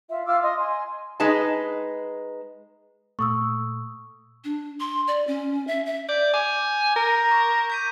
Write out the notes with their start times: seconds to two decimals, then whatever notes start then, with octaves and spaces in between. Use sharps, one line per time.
0.09 F4 E5
0.26 F4 D6 E6 F6
0.42 D#5 C6 D#6
0.58 G#5 C6
1.20 G#3 D#4 B4 A5
3.19 A#2 A3 C#6 D#6 E6
4.44 D4
4.80 C6
5.07 D5
5.27 C#4
5.67 E5
5.86 E5
6.09 D5 G6
6.34 G#5 D6
6.96 A#4
7.31 C#6
7.70 G6 B6 D#7